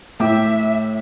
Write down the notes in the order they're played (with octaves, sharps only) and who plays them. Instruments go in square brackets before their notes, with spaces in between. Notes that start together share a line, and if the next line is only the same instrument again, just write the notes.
[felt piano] A2 G5 D6 [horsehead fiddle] E5